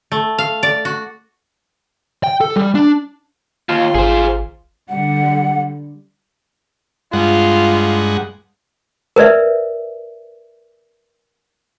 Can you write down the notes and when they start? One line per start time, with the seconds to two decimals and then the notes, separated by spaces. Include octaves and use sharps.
0.12 A3
0.38 F5
0.63 D5
0.85 F#4
2.24 G5
2.41 A4
2.56 G3
2.75 D4
3.69 D#2 F4
3.95 G#1 G#4 C5
4.89 D3 G3 F#5
7.13 G2 G#3 F4 F#5
9.16 A#4 B4 D5 E5